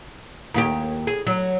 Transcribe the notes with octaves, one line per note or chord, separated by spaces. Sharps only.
D#2 F#4 G4
G#4
F#3